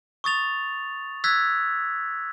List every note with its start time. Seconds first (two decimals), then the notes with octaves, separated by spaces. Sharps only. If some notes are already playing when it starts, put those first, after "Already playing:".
0.24 C#6 D#6 A6 F7
1.24 E6 F#6 G#6 A6 B6